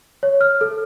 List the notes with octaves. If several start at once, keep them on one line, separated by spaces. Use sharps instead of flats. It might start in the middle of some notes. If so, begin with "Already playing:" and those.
C#5
F6
A4